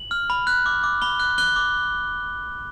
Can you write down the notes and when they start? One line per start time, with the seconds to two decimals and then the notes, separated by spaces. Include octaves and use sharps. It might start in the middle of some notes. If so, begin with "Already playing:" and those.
Already playing: F#7
0.11 F6
0.30 B5
0.47 F#6
0.66 D6
0.84 D6
1.02 B5 G7
1.20 F#6
1.38 F#6 G7
1.56 D6